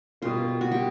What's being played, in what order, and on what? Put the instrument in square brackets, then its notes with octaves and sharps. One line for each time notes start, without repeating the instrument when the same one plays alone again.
[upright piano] B2 G3 A#3 [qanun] F4
[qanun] F#4
G4